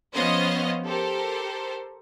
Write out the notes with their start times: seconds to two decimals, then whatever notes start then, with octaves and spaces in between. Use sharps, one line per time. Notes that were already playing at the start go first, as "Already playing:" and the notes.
0.14 F3 B3 C#4 C5 D#5 F5
0.86 G4 A4 A#4 C5